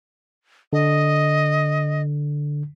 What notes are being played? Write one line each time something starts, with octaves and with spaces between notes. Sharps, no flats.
D3 D#5